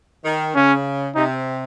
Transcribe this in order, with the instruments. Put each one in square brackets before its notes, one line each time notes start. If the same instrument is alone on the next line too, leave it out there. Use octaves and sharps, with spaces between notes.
[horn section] D#3
[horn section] C#3 [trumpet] C#4
[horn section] C3 [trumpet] D#4